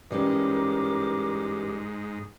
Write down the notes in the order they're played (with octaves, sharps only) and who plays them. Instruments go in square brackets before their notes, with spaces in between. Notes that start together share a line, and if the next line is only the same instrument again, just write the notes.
[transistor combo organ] G#2 [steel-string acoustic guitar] E3 G3 C#4 [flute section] A#4 D6